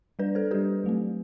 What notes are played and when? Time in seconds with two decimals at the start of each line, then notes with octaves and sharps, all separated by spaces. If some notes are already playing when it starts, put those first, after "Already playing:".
0.19 G3 D4 B4 D5
0.35 A4 C5
0.51 G3 D4 G4 B4
0.84 F#3 A3 C4